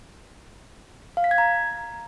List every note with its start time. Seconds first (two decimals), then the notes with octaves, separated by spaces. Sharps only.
1.17 F5
1.24 B6
1.31 G#6
1.38 A#5